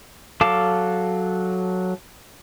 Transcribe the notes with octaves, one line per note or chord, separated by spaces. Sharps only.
F#3 A4 F5 A5 D6